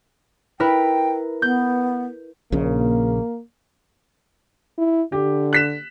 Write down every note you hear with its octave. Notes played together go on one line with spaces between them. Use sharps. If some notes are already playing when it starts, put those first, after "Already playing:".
E4 A#4 B4 G5
B3 G6
A#1 A#2 C#3 A#3
E4
D3 G4
F#6 B6 E7